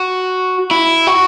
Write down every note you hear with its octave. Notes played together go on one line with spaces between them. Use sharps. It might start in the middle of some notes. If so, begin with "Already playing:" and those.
Already playing: F#4
E4
F#4